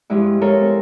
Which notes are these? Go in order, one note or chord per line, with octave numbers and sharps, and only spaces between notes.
G2 F3 G#3 E4
G#3 F4 A4 A#4 C#5
C4